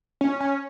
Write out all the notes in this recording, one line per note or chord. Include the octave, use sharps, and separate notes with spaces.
C#4
C#4